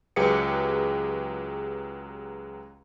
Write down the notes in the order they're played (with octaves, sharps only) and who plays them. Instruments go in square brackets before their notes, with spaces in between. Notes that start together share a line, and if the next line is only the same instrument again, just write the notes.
[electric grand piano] C#2 F#3 G4 G#4 B4 C#7